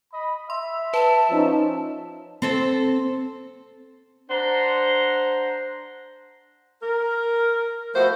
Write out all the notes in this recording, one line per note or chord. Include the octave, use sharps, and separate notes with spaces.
D#5 B5
E5 C6
B4 A5
F3 C#4 D#4
C4 A4 C5
D4 C5 F#5 A#5
A#4
F3 A3 B3 E4 F#4 C5